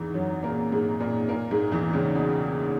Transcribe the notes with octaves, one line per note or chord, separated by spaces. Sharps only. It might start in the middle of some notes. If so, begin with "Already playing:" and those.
Already playing: E2 G#2 E3
F#2 F#3
A#2 A#3
G#2 G#3
A#2 A#3
A#2 A#3
G#2 G#3
E2 E3
C#2 C#3
B2